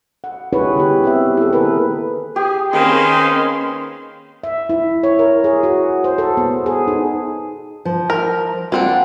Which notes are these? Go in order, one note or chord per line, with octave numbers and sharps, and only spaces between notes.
F#5
D#4 E4 G4 G#4 B4 C#5
D3 B3 G4
C4 G4 E5
E4 A4
D#3 A#3 C4 G#4 A#4 B4
G4 G#4
D#3 A#3 C4 C#4 G#4 B4 C6
E5
E4
C#5
A#4
G#4
F#4
C5
A4
B3
G#4
D#4
F3
A#4
A#3 C4 D4 F4 F#5